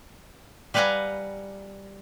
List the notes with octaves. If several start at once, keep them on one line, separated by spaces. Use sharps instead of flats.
G3 B4 F5 F#5 G#5 A#5